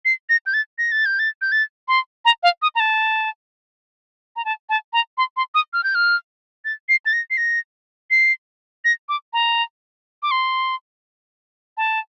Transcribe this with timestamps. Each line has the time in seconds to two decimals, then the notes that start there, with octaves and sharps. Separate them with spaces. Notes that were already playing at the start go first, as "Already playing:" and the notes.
0.05 C7
0.29 A#6
0.46 G6
0.54 A6
0.78 A#6
0.92 A6
1.06 G6
1.19 A6
1.42 G6
1.52 A6
1.88 C6
2.25 A#5
2.43 F5
2.62 D#6
2.75 A#5
2.80 A5
4.36 A#5
4.45 A5
4.69 A5
4.93 A#5
5.18 C6
5.37 C6
5.55 D#6
5.73 F6
5.84 G6
5.95 F6
6.65 A6
6.89 C7
7.06 A6
7.13 A#6
7.30 C7
7.37 A#6
8.11 C7
8.85 A#6
9.09 D6
9.33 A#5
10.23 D6
10.31 C6
11.77 A5